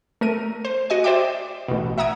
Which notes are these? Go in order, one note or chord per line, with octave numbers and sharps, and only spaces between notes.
A3 A#4 D#7
C5
F#4 D#5 G#5
C5 D5 E5 G5 D6
A1 B2
E5 F#5 A#5 D#6 G#6 D7